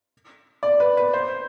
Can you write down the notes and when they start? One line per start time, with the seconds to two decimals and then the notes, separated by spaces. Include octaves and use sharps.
0.63 D5
0.80 B4
0.97 B4
1.14 C5